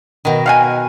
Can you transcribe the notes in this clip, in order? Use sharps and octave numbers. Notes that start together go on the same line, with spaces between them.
B2 D#3
F5 F#5 G#5